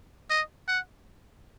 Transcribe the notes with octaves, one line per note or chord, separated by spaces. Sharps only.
D#5
F#5